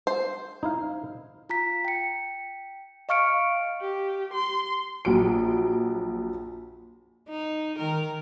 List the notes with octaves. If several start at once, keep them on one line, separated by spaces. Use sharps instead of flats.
C5
D#4 E4 F5
F4 A#5 B6
G5 C#7
D#5 F5 C#6 F6 C#7 D7
G4
C6
A#1 F#3 D7
D#4
D#3 A#4